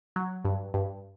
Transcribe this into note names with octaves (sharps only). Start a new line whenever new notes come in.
F#3
G2
G2